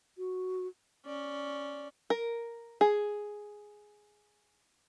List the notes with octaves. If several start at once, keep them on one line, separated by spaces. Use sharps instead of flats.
F#4
C#4 D5
A#4
G#4